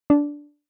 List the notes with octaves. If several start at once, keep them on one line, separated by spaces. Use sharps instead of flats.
D4